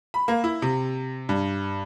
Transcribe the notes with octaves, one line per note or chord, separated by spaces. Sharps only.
B5
A#3
E4
C3
G2